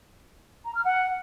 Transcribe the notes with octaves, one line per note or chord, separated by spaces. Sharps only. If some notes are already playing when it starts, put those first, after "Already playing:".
A#5
F6
F#5